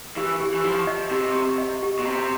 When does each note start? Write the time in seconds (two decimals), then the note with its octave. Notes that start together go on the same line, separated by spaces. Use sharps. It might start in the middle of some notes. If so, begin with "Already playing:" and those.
0.16 E3 G4
0.41 G4
0.54 E3
0.64 F3 G4
0.87 D#5
1.11 C3 G4
1.36 G4
1.58 D#5
1.83 G4
1.99 B2
2.05 C3 A#5